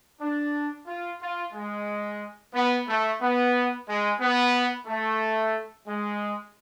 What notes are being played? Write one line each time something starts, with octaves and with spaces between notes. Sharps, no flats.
D4
F4
F4
G#3
B3
A3
B3
G#3
B3
A3
G#3